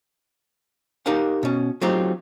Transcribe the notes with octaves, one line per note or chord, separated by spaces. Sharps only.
D#4 G4 A#4 F5 F#5
B2 C#4
F#3 A3 C4 D#4 F4 G4